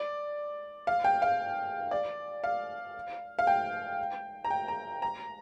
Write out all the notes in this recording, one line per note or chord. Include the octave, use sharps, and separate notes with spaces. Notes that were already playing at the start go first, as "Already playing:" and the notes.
Already playing: D5
F5
G5
F5
D5
F5
F5
G5
A#5
G5
A#5
A#5